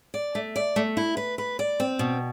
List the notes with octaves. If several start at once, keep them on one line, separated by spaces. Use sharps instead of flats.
D5
A3
D5
A3
E4
B4
B4
D5
C4
B2